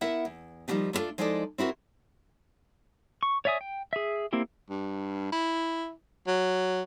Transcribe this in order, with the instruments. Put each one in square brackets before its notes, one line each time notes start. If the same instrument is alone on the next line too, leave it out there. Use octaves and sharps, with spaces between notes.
[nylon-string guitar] B3 E4 A#4 E5 F#5
E2
D#3 F3 G3 A3 D4 D#4
A3 B3 D4 F4 A4
F3 G#3 D#4 E4 A4 D5
C4 E4 F#4 A#4
[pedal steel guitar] C#6
C#5 D5 E5 G#5 D#6
G5
G#4 E5
A#3 C4 E4 G4
[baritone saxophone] G2
E4
F#3